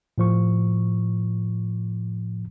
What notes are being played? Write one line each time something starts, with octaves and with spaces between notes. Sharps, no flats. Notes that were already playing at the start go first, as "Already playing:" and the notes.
A2 F3 C#6